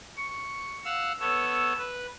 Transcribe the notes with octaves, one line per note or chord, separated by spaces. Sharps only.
C#6
F5 F#5 E6
B3 A4 C#5 E6
B4